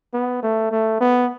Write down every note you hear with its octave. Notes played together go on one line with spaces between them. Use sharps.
B3
A3
A3
B3